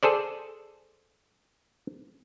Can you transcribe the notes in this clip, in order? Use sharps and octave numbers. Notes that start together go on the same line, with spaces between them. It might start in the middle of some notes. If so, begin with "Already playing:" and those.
G#4 A4 C5 D5